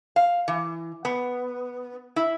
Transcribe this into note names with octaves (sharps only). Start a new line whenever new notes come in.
F5
E3
B3
E4